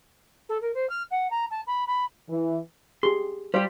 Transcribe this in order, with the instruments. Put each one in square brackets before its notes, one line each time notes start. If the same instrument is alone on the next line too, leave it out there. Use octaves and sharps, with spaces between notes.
[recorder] A4
A#4
C5
F6
F#5
A#5
A5
B5
B5
[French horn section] E3
[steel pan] G4 G#4 [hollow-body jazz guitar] C6
[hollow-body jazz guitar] G3 G4 [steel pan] C5 D5 F5